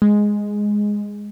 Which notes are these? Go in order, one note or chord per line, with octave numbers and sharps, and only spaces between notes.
G#3